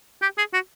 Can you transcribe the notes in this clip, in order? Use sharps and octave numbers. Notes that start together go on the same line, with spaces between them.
G4
G#4
F#4